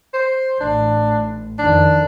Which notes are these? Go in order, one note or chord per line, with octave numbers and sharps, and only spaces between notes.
C5
A1 D4
F2 D#3 D4